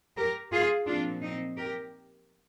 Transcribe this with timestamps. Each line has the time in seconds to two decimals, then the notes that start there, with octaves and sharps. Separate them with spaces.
0.16 G4 A#4
0.52 F4 G#4
0.87 A#2 F3 C4 D4 F4
1.22 C4 D#4
1.57 G4 A#4